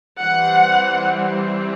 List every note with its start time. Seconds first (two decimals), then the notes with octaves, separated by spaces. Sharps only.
0.20 E3 G3 C4 F#5